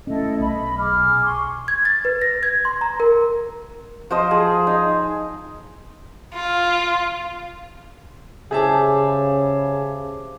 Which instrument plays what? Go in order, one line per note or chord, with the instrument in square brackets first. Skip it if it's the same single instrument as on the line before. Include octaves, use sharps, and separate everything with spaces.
[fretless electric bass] A3 C#4 [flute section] E4 A4 D#5
[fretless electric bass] B1 [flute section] D#5 B5
[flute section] G#4 D6 F6
G#5 C6 C#6
[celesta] G#6
A6
B4
A#6
G#6
C6
A#5
A#4
[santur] F3 C5 D#5
G#4
D#4
[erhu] F4
[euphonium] C#3 [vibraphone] G4 C5 D6 [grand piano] G#4 E5 A5